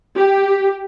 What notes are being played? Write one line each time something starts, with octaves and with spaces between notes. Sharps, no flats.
G4